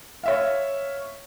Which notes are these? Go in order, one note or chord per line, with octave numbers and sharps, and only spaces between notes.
C#5 E5 F5